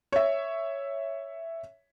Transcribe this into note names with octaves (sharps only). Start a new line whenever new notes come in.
C#5 E5